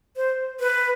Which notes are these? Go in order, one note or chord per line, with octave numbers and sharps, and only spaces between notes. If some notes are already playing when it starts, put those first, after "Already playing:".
C5
B4